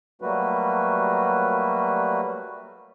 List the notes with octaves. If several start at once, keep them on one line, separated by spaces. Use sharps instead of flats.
F#3 G3 A3 A#3 F#4 B4